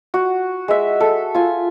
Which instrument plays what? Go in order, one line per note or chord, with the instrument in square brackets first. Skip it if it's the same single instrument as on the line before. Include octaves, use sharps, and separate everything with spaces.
[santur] F#4
G#3 E5
A4
F4 G#5